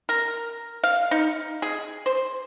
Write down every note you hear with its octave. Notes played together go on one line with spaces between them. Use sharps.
A#4
F5
D#4
G#4
C5